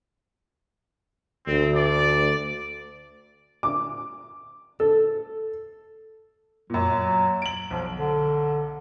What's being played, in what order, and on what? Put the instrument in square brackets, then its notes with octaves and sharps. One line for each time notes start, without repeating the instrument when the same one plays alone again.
[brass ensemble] D2 [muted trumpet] C4
[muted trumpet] D5
[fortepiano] D6
A4
[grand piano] F#2 A#2 [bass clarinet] F#3
[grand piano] D7 F#7
[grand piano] B1 [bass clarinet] F3
[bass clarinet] D3